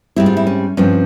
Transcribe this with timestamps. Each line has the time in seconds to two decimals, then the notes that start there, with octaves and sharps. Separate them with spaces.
0.16 G#2 G3 C4 E4
0.26 F4
0.37 E4
0.47 C#4
0.77 G2 F3 C4 C#4